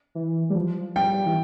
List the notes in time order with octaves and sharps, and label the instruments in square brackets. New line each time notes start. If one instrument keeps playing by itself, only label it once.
[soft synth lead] E3
G3
F3
[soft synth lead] G3 [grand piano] G5
[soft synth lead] E3